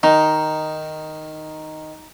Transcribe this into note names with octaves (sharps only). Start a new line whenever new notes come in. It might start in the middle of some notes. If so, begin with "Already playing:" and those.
D#3 D#4